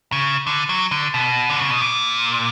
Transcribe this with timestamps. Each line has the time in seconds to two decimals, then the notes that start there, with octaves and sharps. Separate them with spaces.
0.12 C#3
0.47 D3
0.69 F#3
0.91 D3
1.14 B2
1.50 D3
1.60 C#3
1.70 B2
1.81 A#2